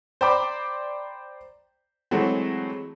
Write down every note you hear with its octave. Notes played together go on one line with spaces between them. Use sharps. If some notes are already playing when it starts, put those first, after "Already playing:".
C5 D5 G5 A#5 B5 D6
E3 F#3 G#3 A3 C4